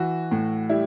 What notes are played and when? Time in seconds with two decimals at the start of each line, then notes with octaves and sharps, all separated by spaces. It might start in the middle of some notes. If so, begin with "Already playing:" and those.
Already playing: E3 F#4
0.31 A2
0.70 G3 E4